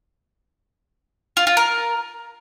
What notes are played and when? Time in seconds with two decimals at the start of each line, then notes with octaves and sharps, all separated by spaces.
1.37 F4
1.47 F4
1.57 A#4